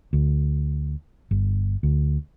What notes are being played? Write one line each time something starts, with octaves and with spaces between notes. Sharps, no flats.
D2
G1
D2